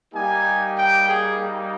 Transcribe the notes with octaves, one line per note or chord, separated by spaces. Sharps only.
G3 A#3 D#4 G4 G#5
G5
G#4